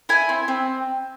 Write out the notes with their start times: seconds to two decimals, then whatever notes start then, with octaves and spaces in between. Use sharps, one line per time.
0.09 E4 G#5
0.29 C4
0.48 C4